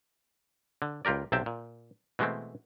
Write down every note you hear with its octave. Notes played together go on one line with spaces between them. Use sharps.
D3
C#2 F4 G4 A#4 D5
B1 C3 C4 E5 G5 A5
A#2
B2 E3 G#3 A3 C4